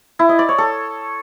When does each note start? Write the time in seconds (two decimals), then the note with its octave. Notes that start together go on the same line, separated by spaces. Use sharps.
0.19 E4
0.29 D#5
0.39 D5
0.49 C#5
0.58 A4